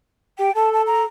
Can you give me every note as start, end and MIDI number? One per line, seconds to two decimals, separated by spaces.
0.39 0.50 67
0.39 0.55 79
0.55 1.05 69
0.55 0.72 81
0.73 0.82 81
0.87 1.03 82